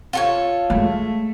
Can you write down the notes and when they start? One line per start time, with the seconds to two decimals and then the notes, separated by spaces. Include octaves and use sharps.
0.13 F4 A4 C#5
0.70 G#3 A3